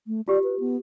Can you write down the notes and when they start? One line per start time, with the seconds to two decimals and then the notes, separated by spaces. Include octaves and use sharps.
0.07 A3
0.28 F4 G4 D5
0.44 B4
0.60 B3